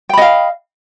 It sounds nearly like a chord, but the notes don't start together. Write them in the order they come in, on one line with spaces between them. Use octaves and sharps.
G5 B5 D#5 F5